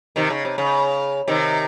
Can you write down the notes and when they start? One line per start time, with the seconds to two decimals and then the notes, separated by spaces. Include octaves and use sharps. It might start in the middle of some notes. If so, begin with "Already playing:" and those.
0.16 C3 D#3
0.30 C#3
0.45 C3
0.58 C#3
1.28 C3 D#3